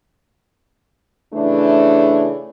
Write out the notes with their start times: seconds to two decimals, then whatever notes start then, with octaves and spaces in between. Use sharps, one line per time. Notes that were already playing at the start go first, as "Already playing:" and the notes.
1.33 C#3 E3 A3 D4